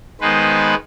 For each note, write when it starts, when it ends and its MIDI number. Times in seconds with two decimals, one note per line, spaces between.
0.21 0.75 51
0.21 0.75 56
0.21 0.75 59
0.21 0.75 71
0.21 0.75 72